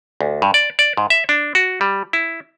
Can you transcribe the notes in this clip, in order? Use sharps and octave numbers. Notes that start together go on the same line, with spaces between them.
D2
G2
D5
D5
G#2
E5
D4
F#4
G3
E4